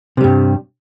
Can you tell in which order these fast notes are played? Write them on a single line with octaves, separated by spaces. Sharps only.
C3 G3 G2